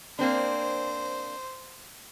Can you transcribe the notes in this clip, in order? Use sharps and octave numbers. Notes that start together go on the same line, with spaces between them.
A#3 C4 D4 C5